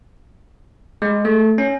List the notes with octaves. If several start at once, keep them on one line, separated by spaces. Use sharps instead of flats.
G#3
A3
C#4